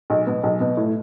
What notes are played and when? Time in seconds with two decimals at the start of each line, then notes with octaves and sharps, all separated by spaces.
0.10 B1
0.27 B2 B3
0.43 B1
0.60 B2 B3
0.77 A2